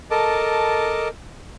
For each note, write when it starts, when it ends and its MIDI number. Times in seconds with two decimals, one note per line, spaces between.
0.11 1.08 69
0.11 1.08 70
0.11 1.08 75
0.11 1.08 81
0.11 1.08 86